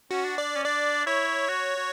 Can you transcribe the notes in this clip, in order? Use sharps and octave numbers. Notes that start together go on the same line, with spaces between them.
C#4 F#4
D4
D5
C#4
D4 D5
E4 C#5
F#4
F#4